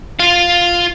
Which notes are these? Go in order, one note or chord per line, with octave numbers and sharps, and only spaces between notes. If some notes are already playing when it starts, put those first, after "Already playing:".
F4 F5